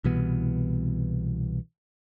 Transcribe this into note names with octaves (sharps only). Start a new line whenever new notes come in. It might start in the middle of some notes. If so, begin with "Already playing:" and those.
C2 B2 E3 B3